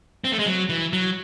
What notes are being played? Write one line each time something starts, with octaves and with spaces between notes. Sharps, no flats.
C4
A3
G#3
F#3
E3
F#3